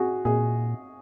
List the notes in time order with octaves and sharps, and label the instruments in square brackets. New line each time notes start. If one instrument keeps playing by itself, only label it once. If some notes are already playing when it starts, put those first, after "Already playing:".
Already playing: [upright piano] F#4 G#4
[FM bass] A#2 [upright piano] G#4